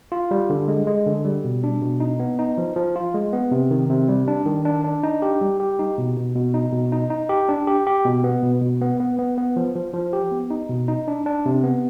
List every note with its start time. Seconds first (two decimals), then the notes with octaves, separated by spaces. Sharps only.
0.12 F4
0.31 G3
0.50 D3
0.68 G#3
0.87 G#3
1.06 D3
1.25 G3
1.44 B2
1.64 D4
1.82 B2
2.00 D#4
2.20 B3
2.39 D#4
2.58 F3
2.76 F3
2.96 F4
3.14 G#3
3.33 B3
3.51 C3
3.71 D#3
3.90 C3
4.09 G3
4.28 D4
4.46 D#3
4.65 D4
4.84 D4
5.03 D#4
5.22 G4
5.41 G3
5.60 G4
5.79 D#4
5.98 B2
6.17 B2
6.36 B2
6.54 D#4
6.73 B2
6.92 D#4
7.10 D#4
7.29 G4
7.49 D4
7.67 G4
7.87 G4
8.05 B2
8.24 B3
8.43 B2
8.62 B2
8.81 B3
9.00 B3
9.19 B3
9.38 B3
9.56 F3
9.75 F3
9.94 F3
10.13 G4
10.31 B3
10.50 D#4
10.69 B2
10.88 D#4
11.08 D4
11.26 D4
11.46 C3
11.63 B3